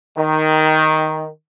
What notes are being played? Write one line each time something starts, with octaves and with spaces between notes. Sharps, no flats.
D#3